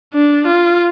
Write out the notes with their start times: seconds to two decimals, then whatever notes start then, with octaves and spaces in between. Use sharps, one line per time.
0.14 D4
0.47 F4